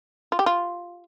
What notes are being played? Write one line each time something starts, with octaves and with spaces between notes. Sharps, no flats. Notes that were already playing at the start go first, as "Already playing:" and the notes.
F4
G4
F4